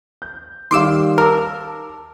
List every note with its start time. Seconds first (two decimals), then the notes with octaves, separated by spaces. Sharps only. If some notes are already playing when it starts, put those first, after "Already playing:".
0.22 G6
0.71 D#3 G3 F5 C6 D6 E6
1.18 A#4 A5 D6 E6